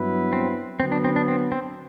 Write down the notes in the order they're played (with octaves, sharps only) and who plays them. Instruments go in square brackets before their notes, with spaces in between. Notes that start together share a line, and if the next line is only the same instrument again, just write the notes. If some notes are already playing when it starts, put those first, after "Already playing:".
Already playing: [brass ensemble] G2 F#3 B3 E4 B4
[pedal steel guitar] C4
[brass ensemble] D3 F#3 B3 [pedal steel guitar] C4
[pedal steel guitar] D4
C4
D4
C4
C4